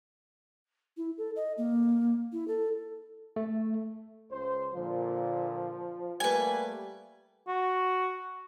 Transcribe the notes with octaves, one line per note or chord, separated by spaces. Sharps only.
E4
A4
D#5
A#3
E4
A4
A3
C#2 C5
A#2 D3 F3
G3 A3 A#3 B4 G#5
F#4